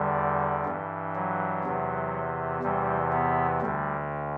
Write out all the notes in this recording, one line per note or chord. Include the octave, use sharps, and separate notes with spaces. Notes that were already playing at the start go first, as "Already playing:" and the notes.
Already playing: E2 D3 G3
G2 E3
F#3
E2 C3 E3
E2 C3 E3 G3
B3
D2 D3 G3